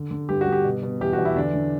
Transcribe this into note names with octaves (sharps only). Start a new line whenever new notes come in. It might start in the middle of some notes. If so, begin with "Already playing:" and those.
Already playing: D3
D3
G2 G4
F#4
G2
G4
B2
B2
E2 G4
F#4
E2
E4
D3 D4
D3